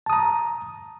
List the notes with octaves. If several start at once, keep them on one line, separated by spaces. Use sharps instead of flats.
A5 A#5 D#6